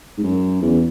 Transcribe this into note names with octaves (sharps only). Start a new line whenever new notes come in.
G#2
F#2
E2